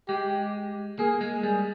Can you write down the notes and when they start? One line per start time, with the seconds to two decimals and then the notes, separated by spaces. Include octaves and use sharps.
0.08 G#3 G4
0.99 A#3 G#4
1.21 G#3
1.43 G3 G#4